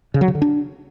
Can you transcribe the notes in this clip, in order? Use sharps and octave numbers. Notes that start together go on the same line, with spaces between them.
C#3
F#3
C#3
D3
D4